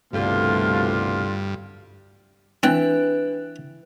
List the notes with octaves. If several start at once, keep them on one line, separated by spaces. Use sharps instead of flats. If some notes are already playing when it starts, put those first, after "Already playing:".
C2 G2 B2 D3 A3 F4
E3 C4 D4 B4 G5 F#6